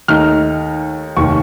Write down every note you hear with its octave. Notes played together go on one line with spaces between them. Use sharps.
D#2 D#3 A3 D#4 F6
F1 D#2 D#3 C#6